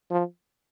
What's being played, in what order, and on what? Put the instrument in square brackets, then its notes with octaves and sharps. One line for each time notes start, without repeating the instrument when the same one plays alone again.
[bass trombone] F3